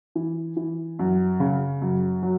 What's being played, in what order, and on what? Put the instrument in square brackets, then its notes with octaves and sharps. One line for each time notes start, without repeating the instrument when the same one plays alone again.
[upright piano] E3
E3
F#2
C#3
F#2
F#3